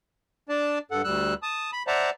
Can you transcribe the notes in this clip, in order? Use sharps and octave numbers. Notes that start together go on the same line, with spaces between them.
D4 D5 A5
G2 A4 F#5
D2 G3 E6 F#6
A5 D#6
B5
C5 D5 E5 F#5 A5 A#5